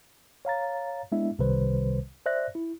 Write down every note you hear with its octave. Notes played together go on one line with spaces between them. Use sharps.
C#5 F5 A#5 A6
G#3 B3 D4 E4 E5
C2 C3 D#3 G3 B4 C5
C5 D5 E5 F#6 A#6
E4